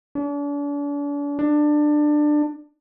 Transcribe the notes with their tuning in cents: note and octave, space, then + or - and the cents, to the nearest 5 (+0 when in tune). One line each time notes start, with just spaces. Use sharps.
D4 -40
D4 +20